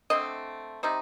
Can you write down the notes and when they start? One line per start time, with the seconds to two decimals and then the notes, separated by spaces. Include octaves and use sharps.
0.10 D3 A3 C4 D#5
0.83 C3 G3 C4 D#4